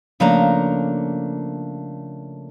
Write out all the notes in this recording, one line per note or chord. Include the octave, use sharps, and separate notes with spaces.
C#3 F3 A3 A#3 D4 A#5